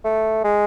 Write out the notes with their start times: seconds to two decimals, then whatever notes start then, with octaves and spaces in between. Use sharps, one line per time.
0.04 A3
0.44 G#3